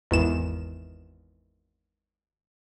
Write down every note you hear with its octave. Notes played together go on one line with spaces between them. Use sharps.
G#1 E2 E7